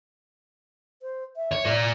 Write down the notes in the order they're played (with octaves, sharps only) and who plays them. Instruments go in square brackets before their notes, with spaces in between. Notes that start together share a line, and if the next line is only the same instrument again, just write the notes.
[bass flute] C5
E5
[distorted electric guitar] C#5
F4 D5